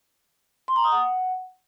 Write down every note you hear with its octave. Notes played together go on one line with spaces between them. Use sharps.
C6
A#5
D#6
F#5